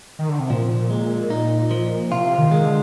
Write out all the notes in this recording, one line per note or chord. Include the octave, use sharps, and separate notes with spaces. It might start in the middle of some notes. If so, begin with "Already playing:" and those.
D#3
D3
C3
A#2 F3
G#3
D#4
F3
C3 F4
D#3
G#3
D3